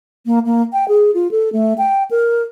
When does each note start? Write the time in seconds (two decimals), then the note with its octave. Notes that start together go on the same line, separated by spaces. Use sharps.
0.26 A#3
0.45 A#3
0.73 G5
0.88 G#4
1.14 F4
1.31 A4
1.52 A3
1.78 G5
2.11 A#4